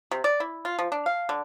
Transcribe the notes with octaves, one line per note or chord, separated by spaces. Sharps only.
C3
D5
E4
F4
F3
D4
F5
D3